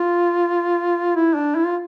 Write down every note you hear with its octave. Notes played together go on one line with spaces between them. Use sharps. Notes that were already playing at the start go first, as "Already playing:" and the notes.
Already playing: F4
E4
D4
E4
F4